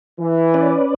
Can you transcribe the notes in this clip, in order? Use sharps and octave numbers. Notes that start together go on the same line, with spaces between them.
E3
C#4 B4 D5